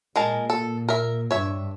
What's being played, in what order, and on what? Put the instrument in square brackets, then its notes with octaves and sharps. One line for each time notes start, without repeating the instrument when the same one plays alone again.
[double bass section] A#2 [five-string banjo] G#3 A#4 A5
[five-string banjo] A4
A#4 E5
[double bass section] G2 [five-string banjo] C#5 E5